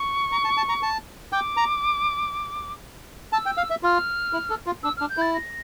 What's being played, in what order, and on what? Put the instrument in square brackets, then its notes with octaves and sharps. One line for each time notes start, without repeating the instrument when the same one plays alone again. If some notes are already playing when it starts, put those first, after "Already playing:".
Already playing: [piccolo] C#6
[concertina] A#5
A5
A5
A#5
A5
[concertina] G5 [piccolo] D6
[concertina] A#5
[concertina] A5 [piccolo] E6
[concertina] G5
F5
E5
[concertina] F4 [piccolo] F6
[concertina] E4
A4
F4
[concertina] D4 [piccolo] E6
[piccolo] F6
[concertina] D4
[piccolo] G6
[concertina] E4 [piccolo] A6
[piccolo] A#6